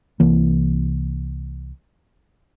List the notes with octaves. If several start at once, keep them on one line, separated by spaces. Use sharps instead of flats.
C2 E3 A#3